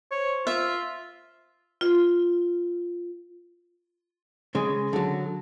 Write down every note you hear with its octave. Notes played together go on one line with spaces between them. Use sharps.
C5 C#5
F4 E5
F4
C#3 G#3
D3 F#3